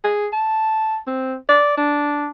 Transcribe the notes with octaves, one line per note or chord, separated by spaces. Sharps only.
G#4
A5
C4
D5
D4